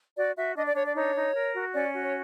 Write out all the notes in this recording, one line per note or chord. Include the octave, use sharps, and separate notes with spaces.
F#4 D5
F#4 E5
D4 D#5
D5
D4 C#5
D5
D#4 C#5
D#4
A#4
F#4
C#4 D5
F#4
C#5